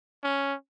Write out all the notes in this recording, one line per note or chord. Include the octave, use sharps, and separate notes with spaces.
C#4